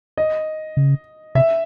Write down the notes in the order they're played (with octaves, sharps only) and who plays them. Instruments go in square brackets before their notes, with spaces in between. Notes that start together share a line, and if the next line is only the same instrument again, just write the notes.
[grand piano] D#5
[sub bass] C#3
[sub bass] C3 [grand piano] E5